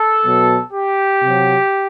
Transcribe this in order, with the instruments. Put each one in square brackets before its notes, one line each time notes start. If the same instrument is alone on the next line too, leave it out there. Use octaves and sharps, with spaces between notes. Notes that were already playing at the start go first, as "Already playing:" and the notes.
Already playing: [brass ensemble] A4
B2 F#3
G4
C3 F#3